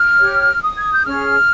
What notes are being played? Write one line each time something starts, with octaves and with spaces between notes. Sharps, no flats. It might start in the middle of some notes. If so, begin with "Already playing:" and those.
Already playing: F6
G4 C#5
D#6
G#6
G6
C#4 G#4 C#5 F6